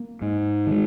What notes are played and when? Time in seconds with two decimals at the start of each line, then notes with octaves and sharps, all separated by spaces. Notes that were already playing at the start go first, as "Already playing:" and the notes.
Already playing: A#3
0.21 G#2
0.67 D#3 G#3